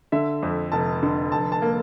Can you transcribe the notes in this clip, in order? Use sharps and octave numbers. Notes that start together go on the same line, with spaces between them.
D3 E5
F2
F1 A5
D3
F1 A5
A5
A#3